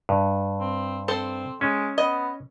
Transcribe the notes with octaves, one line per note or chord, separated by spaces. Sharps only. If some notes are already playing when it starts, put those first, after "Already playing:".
G2
C4
C4 A4 C5
G#3 C#4
B3 D#5